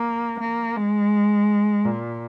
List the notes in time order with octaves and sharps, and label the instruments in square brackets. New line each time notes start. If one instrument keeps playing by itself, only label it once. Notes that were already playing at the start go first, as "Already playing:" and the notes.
Already playing: [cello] A#3
A#3
G#3
A#2